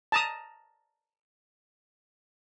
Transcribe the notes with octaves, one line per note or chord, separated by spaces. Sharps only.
A5 A#5 D#6